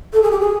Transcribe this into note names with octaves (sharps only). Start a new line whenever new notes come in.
A4
G#4
G4
G#4